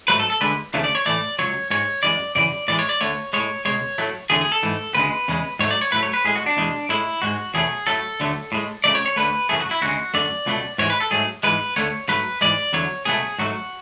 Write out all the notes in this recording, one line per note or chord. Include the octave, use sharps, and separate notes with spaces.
G#2 F#3 A3 B4
A4
A4
D2 D3 G#3 B4
D2 C#3 E3 A3
D5
C#5
A2 E3 A3 D5
C#2 C#3 F#3 C#5
G#2 G#3 C#5
F#2 E3 G#3 D5
F#2 C#3 E3 D5
A2 E3 G#3 D5
C#5
D5
D2 D3 A3 C#5
A2 G#3 C#5
C#2 B2 G#3 C#5
A2 F#3 A3
E2 D3 F#3 A3 G#4
G#4
A4
G#2 E3 A3
D2 C#3 G#3 B4
E2 C#3 G#3
G#2 F#3 A3 C#5
D5
C#5
A2 F#3 A3 B4
C#5
B4
A2 G#3 G#4
F#4
D4
E2 B2 G#3
A2 G#3 E4
G#2 G#3 F#4
E2 B2 F#3 A3 G#4
A2 F#3 A3 A4
D2 D3 F#3 A3
A2 G#3
C#2 C#3 F#3 A3 D5
C#5
C#5
D2 D3 A3 B4
F#2 C#3 E3 A3 G#4
F#4
E4
D2 C#3 G#3 F#4
F#2 D3 A3 D5
C#2 B2 F#3 A3
G#2 E3 G#3 C#5
B4
A4
G#2 F#3 A3 G#4
G#2 E3 G#3 B4
D2 D3 A3 C#5
G#2 F#3 A3 B4
G#2 E3 G#3 D5
E2 D3 F#3 C#5
C#2 B2 F#3 A3 G#4
G#2 F#3 A3 F#4